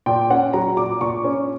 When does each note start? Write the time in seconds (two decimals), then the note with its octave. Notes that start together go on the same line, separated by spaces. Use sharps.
0.06 A#2 G5
0.30 C#4 F#5
0.53 F#3 A#5
0.77 A#2 D6
1.01 A#2 C#6
1.24 C#4